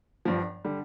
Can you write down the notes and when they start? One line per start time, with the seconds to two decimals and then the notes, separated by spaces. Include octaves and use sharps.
0.25 G1 G2 F3
0.65 D3 G3